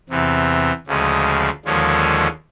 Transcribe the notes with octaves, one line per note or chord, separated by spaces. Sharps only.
E2 C3 E3
D2 C#3 F3 G#3
D#2 D3 F3 G#3 C#4